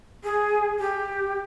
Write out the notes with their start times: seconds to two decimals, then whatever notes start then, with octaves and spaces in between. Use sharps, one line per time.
0.24 G#4
0.79 G4